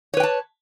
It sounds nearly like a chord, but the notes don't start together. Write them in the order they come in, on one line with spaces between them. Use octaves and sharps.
C#5 B4 G5 A5